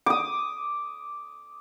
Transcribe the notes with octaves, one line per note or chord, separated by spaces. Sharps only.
D6 D#6